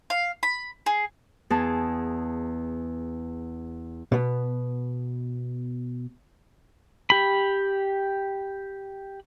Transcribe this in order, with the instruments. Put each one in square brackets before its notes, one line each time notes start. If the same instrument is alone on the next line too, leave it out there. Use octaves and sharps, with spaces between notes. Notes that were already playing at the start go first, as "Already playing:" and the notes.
[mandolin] F5
B5
G#4
[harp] E2 G#4 A5
[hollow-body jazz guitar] B2 B3
[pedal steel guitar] G4 B5